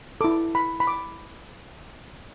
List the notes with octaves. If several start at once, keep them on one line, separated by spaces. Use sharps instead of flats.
E4 A4 D6
B5
B5
D6